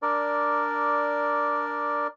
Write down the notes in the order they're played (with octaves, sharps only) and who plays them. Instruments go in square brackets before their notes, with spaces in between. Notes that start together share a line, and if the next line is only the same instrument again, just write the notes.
[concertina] D4 A#4 D5